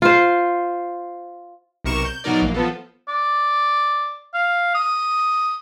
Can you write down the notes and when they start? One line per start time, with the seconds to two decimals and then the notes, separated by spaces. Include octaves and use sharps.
0.02 F4 C5
1.84 B1 C3 A#4 C#6 E7
2.05 G6
2.24 B2 F#3 D#4 A#4 D5
2.42 A#1 A#3
2.54 F3 B3 A4
3.08 D5
4.34 F5
4.75 D#6